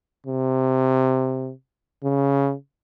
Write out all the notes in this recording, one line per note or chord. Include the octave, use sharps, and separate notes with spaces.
C3
C#3